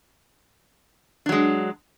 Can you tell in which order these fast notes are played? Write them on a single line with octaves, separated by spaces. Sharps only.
D4 F#3 G#3